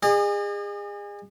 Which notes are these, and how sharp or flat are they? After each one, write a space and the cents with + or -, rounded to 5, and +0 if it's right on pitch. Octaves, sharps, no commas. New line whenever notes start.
G#4 -30 D#5 -45